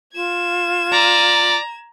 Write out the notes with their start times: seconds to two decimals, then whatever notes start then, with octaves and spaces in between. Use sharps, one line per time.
0.14 F4 G#6 E7
0.93 D5 A#5